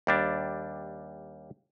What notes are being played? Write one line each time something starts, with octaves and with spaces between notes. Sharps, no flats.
D#2 G3 D4